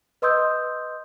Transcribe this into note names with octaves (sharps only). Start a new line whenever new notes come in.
B4 D#5 C6 D#6 E6 G6